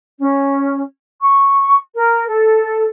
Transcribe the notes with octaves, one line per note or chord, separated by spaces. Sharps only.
C#4
C#6
A#4
A4